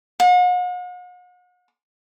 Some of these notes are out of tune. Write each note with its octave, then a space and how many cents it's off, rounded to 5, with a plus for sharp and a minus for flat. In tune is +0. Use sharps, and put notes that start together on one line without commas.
F#5 -45